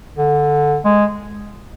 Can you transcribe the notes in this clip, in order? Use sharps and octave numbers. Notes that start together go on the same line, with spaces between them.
D3
G#3